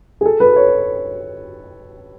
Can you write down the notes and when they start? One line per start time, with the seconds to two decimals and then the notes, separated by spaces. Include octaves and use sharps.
0.21 G#4
0.26 A4
0.40 B4
0.56 C#5